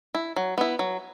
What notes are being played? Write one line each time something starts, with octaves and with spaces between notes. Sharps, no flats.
E4
F#3
B3 E4
F#3